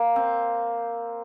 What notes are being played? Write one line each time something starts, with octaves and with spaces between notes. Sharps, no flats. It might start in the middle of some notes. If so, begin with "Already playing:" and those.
Already playing: A#3
C4